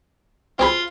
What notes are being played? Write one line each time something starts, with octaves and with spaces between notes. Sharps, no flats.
C4 F4 G#4 B5